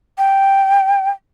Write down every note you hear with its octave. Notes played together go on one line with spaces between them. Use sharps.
G5